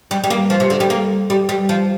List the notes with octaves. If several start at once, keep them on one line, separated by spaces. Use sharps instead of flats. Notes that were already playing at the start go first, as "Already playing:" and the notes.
G3
G3
A#3
F3
C3
D3
G3
A#3
G3
G3
F3